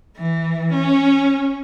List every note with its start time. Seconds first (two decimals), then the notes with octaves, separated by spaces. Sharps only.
0.17 E3
0.73 C#4